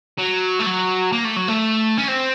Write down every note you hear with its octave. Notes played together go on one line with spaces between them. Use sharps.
F#3
A3
F#3
A#3
A3
F#3
A3
C#4
C4